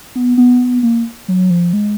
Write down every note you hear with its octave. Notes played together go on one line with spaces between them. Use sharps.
B3
B3
A#3
F#3
F3
G#3